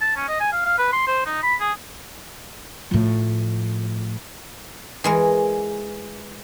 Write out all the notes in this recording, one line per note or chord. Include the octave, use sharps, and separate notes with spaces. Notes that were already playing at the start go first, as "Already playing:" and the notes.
A5
C#4
D#5
G#5
F5
F5
B4
C6
C5
D#4
B5
G#4
A2 F3
E3 G#3 A#4